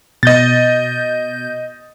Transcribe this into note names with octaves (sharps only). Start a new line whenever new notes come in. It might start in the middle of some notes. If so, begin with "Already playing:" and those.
B2 D#5 G6 A6